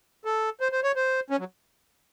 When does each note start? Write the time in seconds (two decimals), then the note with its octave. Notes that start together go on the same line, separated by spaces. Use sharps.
0.25 A4
0.60 C5
0.72 C5
0.84 C#5
0.96 C5
1.30 C#4
1.39 F#3